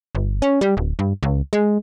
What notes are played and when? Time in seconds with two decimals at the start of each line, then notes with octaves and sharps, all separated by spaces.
0.15 G1
0.42 C#4
0.61 G3
0.77 D1
0.99 G2
1.23 C#2
1.53 G#3